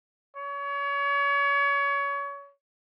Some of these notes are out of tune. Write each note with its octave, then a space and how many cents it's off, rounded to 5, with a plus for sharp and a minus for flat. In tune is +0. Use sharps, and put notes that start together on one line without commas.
C#5 +30